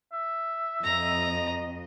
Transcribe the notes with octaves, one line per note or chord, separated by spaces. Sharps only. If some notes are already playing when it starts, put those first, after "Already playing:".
E5
F2 D#5 A#5